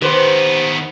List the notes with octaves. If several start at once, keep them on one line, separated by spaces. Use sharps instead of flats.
D#3 B3 G4 B4 C5